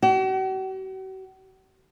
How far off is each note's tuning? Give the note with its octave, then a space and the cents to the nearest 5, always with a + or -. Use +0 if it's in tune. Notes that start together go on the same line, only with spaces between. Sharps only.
F#4 +45